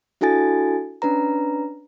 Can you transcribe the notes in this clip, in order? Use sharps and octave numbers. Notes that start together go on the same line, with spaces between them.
D4 E4 F#4 A4 G#5 A6
C#4 D4 B4 A#5